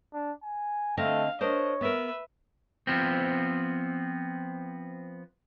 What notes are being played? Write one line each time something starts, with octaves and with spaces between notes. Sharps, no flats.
D4
G#5
D3 A3 C4 D#5 F5
D4 A#4 C5 C#5 D#5
B3 A#4 B4 E5
F3 B3 C4